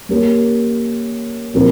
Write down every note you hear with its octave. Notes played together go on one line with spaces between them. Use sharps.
A#3 C#4 G4 A#4
A#2 F3 C4 E4 A#4